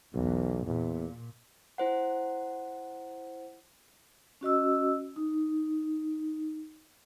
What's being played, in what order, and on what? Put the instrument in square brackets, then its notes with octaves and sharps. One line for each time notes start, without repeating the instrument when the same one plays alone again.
[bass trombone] B1 [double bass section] E2
[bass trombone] E2 [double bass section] A#2
[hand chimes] E4 C5 F#5
[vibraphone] C#4 F#4 D#5 E6
D#4